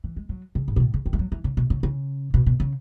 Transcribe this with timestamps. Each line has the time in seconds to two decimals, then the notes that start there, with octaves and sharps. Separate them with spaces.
0.04 E3
0.16 G#3
0.29 F#3
0.55 C#3
0.68 G#2
0.76 B2
0.80 A2
0.94 C#3
1.06 D#3
1.13 G#3
1.19 F#3
1.32 E3
1.44 C#3
1.57 B2
1.70 C#3
1.83 C#3
2.34 B2
2.46 B2
2.60 C#3